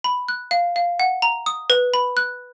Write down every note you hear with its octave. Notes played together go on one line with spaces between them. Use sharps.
B5
F#6
F5
F5
F#5
A#5
D#6
B4
B5
F#6